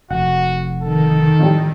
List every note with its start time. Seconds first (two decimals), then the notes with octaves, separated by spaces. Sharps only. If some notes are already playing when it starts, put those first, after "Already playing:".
0.11 F1 F#4 F#5
0.83 D#3 A4
1.39 F2 A2 G3